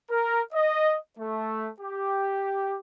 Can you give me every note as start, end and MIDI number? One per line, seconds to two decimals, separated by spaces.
0.10 0.42 70
0.53 0.96 75
1.19 1.69 57
1.80 2.77 67